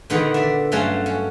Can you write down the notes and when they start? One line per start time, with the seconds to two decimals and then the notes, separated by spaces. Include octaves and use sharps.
0.10 A#2 D3 D#3 B3
0.34 D5 E5
0.72 G2 F#3 A3 C#4 F5 C6
1.06 C#4